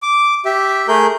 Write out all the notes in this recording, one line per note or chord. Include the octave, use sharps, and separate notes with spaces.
D6
G4 E5
A3 G#4 A#4 G6